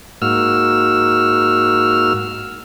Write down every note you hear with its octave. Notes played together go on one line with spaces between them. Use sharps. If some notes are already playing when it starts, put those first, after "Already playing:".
G#2 A#3 F#4 E6 F6